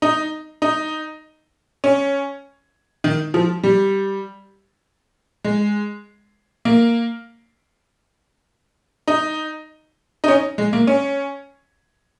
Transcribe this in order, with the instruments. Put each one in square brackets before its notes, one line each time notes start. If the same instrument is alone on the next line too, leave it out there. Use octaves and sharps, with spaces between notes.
[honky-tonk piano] D#4
D#4
C#4
D#3
F3
G3
G#3
A#3
D#4
D#4
C#4
G#3
A#3
C#4